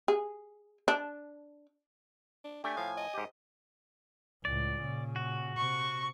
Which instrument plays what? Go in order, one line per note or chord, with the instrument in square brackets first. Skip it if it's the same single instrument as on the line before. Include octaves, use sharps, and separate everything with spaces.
[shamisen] G#4
D4
[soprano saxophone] D4
[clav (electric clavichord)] A3 G4 [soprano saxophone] D4 [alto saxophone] G#5
[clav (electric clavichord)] A2 F3 [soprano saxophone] F5
[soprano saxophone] D#5
[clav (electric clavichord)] G#2 G4
[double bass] C#2 A2 [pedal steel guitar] D5
[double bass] A#2 C#3
[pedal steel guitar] F#4
[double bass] C3 [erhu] C#6